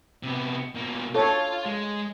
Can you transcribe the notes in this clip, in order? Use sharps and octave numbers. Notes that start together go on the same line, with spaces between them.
C3 B3
B2 A#3
F4 A4 C#5
G#3